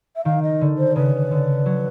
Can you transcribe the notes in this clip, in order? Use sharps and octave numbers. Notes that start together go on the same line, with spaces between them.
E5
D#3 F5
D#5
D3
C5
C#3 B4
D3
F#3